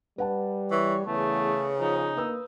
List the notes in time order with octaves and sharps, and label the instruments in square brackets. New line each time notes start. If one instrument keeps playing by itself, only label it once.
[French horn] G3 [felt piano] B4 F#5 A5
[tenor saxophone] E3 [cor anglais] C#5
[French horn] E2 [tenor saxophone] C#3 [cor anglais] A3
[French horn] F3 [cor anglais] D#4
[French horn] A#3 [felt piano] B4 D#6 E6